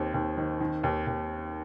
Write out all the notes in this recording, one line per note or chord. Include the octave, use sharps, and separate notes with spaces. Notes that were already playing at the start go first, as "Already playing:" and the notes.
Already playing: D#2 D#3 C4
D#2
D#3
D#3
D#2
D#2